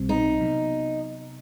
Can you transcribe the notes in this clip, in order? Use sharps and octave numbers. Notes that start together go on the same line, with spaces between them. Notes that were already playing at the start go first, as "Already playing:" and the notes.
Already playing: B1 B2 G3 C4
D#4
C3 F#3 B3